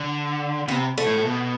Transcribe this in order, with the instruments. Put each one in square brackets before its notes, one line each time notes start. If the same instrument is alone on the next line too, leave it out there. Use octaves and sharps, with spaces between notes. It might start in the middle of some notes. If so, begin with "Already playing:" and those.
Already playing: [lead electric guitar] D3
[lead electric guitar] C3 [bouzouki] B3
[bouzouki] A3
[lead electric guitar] A2
A2
B2